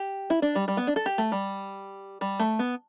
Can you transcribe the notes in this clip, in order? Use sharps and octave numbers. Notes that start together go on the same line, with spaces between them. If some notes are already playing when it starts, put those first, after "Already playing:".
Already playing: G4
E4
D4
G3
G3
B3
D4
A4
G4
A3
G3
G3
A3
B3